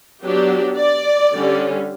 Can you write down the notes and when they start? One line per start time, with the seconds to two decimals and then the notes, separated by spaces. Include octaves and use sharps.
0.22 F#3 B3 D4 G4
0.77 D5
1.33 D3 G3 C#4